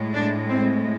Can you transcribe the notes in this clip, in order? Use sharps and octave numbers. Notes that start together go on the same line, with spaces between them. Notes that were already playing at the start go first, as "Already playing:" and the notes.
Already playing: A2 G#3
D4
C4